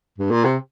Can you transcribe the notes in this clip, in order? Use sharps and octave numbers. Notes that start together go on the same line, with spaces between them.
G2
A#2
C3